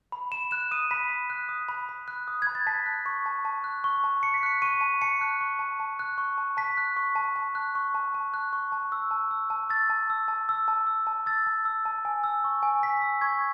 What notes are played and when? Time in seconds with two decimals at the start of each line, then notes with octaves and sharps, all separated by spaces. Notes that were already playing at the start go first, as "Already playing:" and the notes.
0.12 B5
0.31 B5 E7
0.51 F#6 E7
0.71 D#6 D#7
0.91 B5 B6
1.10 B5
1.30 F#6
1.49 D#6
1.69 B5
1.89 B5
2.08 F#6
2.28 D#6
2.42 B5 G#6
2.55 A6
2.67 A5 B6
2.86 F#6
3.06 C#6
3.26 A5
3.45 A5
3.64 F#6
3.84 C#6
4.04 A5
4.23 A5 C#7
4.34 B6
4.43 F#6 C#7
4.62 C#6 D#7
4.81 A5
5.02 A5 C#7
5.21 F#6
5.41 C#6
5.59 A5
5.80 A5
5.99 F#6
6.18 C#6
6.38 A5
6.57 A5 B6
6.77 F#6
6.97 C#6
7.15 A5
7.36 A5
7.55 F#6
7.75 C#6
7.94 A5
8.14 A5
8.34 F#6
8.53 C#6
8.72 A5
8.92 E6
9.11 A5
9.31 E6
9.50 A5
9.70 E6 A6
9.90 A5
10.10 E6
10.28 A5
10.49 E6
10.68 A5
10.87 E6
11.07 A5
11.26 E6 A6
11.46 A5
11.65 E6
11.85 A5
12.05 G#5
12.24 E6
12.44 C#6
12.63 G#5
12.83 G#5 B6
13.02 E6
13.21 C#6 G#6